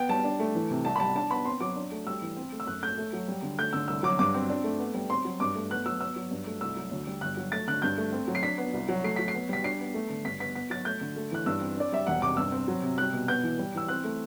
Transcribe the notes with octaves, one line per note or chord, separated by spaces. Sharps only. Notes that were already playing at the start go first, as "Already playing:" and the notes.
Already playing: B3 G5
G3 A5
D4
A3
E3
C3
C2 A5
B5
G3 A5
D4 A5
B3 B5
C4 C6
F#3 D6
D4
A3
G3 E6
E3
C4
A3
E6
F#2 F#6
A3 G6
A3
F#3
G3
D3
A3 G6
D3 E6
C2 E6
F#3 D6
G2 D6
C4
D4
A3
B3
G3
C4 C6
F#3
G2 D6
A3
B3 F#6
F#3 E6
B3 E6
F#3
G2
A3
C2 E6
F#3
D2
G3
G1 F#6
F#3
A3 A6
D3 F#6
G2 G6
A3
C4
F#3
C7
D4 B6
B3
C2
F#3
A3 C7
F#3 B6
C7
B3
G3 B6
D4 C7
B3
A3
D3
G2 B6
B3 B6
B3 B6
F#3 A6
A3 G6
D3
A3
E3 F#6
G2 E6
C4
D4 D5
G3 E5
E1 F#5
C3 D6
G2 E6
C4
F#3
C3
G3 F#6
B2
B3 G6
E3
G3
E3 E6
C4 F#6
A3